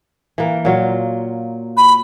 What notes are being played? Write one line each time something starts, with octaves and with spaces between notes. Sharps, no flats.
E3 A#3
A#2 F#3 F4
B5